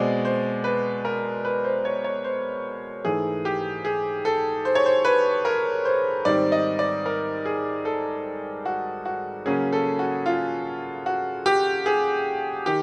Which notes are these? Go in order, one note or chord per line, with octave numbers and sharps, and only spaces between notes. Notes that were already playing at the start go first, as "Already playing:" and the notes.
Already playing: B2 G#3 C4 D5
C5
B4
A#4
B4
C5
C#5
C#5
C5
G#2 E3 A3 G#4
G4
G#4
A4
C5
C#5
C5
B4
A#4
C5
G#2 D#3 G3 C4 D5
D#5
D5
A#4
G#4
A4
F#4
F#4
C#3 F#3 A#3 C#4 G#4
A4
F#4
F4
F#4
G4
G#4
D#3 G4